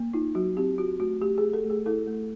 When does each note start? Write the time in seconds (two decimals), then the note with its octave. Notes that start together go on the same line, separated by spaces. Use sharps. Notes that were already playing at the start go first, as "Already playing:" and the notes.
Already playing: A#3
0.13 D#4 F4
0.35 F#3 F#4
0.57 C4 G4
0.78 F4 F#4
1.00 A3 F#4
1.21 A3 G4
1.38 G#4
1.43 A3
1.53 A4
1.64 A3
1.70 G#4
1.86 E4 A4
2.07 A3